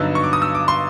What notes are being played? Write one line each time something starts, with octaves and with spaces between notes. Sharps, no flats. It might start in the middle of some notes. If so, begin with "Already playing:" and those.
Already playing: G2 D3 F#3 B3 D#4 E6
C#6
D6
D#6
E6
D6
C6